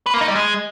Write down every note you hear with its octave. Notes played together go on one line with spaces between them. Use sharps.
B4
A#3
D#4
G3
G#3